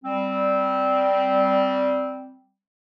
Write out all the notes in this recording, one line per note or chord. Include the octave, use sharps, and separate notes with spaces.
G3 C4